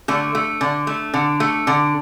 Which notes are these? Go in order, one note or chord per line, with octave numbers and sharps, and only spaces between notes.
D3 A3
A3
D3
A3
D3
A3
D3